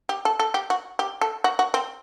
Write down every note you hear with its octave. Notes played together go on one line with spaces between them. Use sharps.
G4
A4
A4
G4
F#4
G4
A4
F#4
F#4
C4